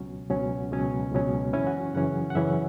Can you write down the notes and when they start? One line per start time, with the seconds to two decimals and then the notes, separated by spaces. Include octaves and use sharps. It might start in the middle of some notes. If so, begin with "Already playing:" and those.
Already playing: C#2 B2 F#3 C#4
0.30 C#2 B2 F#3 C#4
0.71 C#2 B2 F#3 C#4
1.12 C#2 B2 F#3 C#4
1.53 F#2 C#3 E3 C#4 E4
1.67 F#4
1.95 F#2 C#3 E3 C#4 F#5
2.30 F#5
2.35 F#2 C#3 E3 C#4 E5